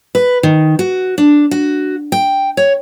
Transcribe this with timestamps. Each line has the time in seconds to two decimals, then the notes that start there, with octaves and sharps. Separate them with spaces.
0.15 B4
0.43 D#3
0.79 F#4
1.18 D4
1.51 F#4
2.12 G5
2.57 C#5